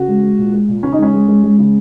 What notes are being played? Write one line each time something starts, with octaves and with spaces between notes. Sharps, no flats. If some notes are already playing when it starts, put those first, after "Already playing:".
Already playing: C#3 F#4
G#3
G#3
A#2
G#3
A#2
C#3 C#4
D#4
G#3 C#4
G#3
G#3
G#3
C#3